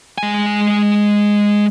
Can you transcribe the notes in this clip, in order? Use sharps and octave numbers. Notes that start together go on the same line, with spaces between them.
G#3 G#5